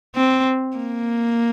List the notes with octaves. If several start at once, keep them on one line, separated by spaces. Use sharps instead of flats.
C4
A#3